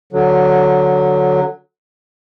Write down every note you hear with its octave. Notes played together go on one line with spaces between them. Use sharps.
D3 F#3